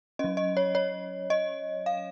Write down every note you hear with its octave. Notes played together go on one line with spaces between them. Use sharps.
F#3 C#4 D#5
D#5
C#5
C#5
D#5
F5